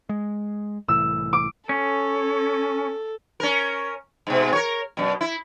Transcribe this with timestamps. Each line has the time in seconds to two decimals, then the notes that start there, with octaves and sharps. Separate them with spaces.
0.09 G#3
0.88 C2 A2 E3 E6
1.33 D6
1.69 C#4 A4
3.40 C#4 A#4
4.27 G#2 B2
4.53 A#4 C#5
4.97 F#2 B2
5.21 E4